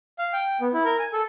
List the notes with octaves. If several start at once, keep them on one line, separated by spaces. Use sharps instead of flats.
F5
G5
B3
E4
A#4
G#5
A4